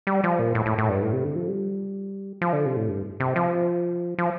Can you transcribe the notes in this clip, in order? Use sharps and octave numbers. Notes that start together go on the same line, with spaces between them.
G3
F3
A#2
A2
A2
A2
G2
A2
C3
D3
F3
G3
F3
D3
C3
A2
G2
C3
F3
F3